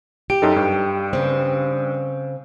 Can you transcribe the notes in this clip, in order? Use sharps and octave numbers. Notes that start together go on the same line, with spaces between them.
G4 D7
F#2 D#4 A4
G2
C#3 C4